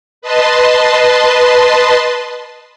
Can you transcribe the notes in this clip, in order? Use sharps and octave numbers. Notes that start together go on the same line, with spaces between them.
B4 D#5 A5 C6